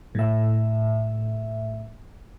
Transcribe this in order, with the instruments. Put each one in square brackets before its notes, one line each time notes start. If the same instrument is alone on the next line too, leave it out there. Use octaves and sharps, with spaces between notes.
[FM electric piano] A2 E5